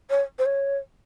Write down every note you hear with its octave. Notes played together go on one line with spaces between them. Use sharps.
C#5
C5
C#5